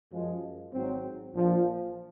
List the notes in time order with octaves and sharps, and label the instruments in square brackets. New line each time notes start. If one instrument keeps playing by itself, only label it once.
[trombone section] F#2 F3 G#3
G#1 G#2 F#3 C4
A#1 A#2 F3